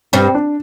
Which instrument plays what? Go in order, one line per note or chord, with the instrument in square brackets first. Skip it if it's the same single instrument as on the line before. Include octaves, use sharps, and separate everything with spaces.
[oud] G2 G3 [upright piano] C4
[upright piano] D4